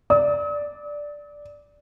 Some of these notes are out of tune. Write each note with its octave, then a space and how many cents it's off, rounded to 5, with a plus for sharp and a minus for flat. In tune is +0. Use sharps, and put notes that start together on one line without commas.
D5 +0 D#6 +45